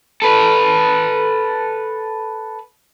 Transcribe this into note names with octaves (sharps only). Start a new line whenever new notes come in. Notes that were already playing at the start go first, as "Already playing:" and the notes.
A4 B4